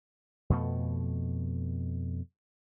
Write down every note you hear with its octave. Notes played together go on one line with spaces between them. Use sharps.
F2 B2 A3